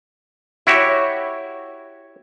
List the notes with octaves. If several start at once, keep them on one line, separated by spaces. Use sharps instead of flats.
E4 F#4 G4 C#5